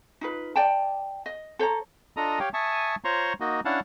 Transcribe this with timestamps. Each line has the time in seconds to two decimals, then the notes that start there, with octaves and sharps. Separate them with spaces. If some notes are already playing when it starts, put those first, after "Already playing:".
0.21 D#4 F4 B4
0.56 D5 G5 A5
1.26 D#5
1.59 A4 C5 C#5 A#5
2.17 D4 F4 A4 D#5 A#5 D#6
2.40 G4 C#5 F5 G5
2.54 E5 G#5 A5 C#6 D#6
3.04 F4 C5 C#5 A#5 C6 C#6
3.40 A#3 D#4 F#4 D#5
3.65 C#4 D4 E4 F5 F#5 A5